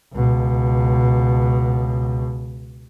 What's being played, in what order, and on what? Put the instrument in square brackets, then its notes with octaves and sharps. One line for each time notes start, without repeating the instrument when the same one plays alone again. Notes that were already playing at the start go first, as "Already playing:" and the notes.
[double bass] C#2 B2